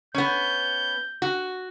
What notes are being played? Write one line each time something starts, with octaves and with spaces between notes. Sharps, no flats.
B3 C#4 G6
F#4